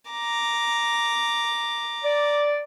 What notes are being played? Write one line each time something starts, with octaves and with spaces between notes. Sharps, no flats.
A#5 D6
D5